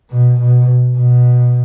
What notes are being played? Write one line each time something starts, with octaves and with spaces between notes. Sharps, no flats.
B2
B2
B2